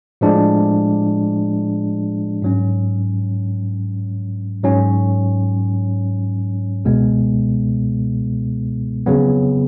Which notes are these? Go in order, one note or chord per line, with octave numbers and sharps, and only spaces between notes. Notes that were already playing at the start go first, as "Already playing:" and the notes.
A2 F3 G#3 D4
G#2 F#3 C#4
G#2 F#3 C#4
C#2 B2 G#3 B3
F2 C#3 F#3 B3